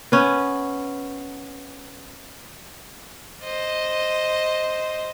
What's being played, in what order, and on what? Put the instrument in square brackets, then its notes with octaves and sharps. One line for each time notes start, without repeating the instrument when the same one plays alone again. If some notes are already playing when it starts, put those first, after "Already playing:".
[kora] B3 C#4
[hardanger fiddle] C5 D#5